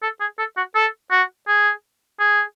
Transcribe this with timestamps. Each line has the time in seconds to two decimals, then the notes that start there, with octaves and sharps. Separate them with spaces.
0.03 A4
0.20 G#4
0.39 A4
0.57 F#4
0.75 A4
1.11 F#4
1.48 G#4
2.19 G#4